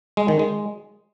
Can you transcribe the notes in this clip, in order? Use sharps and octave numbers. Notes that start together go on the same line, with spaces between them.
G#3
D#3
G#3